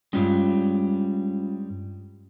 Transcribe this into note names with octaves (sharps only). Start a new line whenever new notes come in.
G2 G3 G#3 C#4 F4